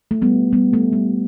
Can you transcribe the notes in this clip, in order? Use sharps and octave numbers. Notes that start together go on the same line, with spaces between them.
A3
G3 B3
G3 B3
A3
G3